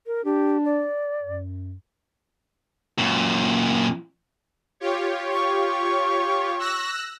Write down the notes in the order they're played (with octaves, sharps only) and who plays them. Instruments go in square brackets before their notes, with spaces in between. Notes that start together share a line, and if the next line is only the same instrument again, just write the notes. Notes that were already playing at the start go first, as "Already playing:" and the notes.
[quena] A#4
[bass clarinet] D4 [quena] G4
[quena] D5
[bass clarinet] F#2
[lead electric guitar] F#2 A#2
[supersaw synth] F4 G4 C#5
[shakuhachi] C#6
[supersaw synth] E6 F#6 A#6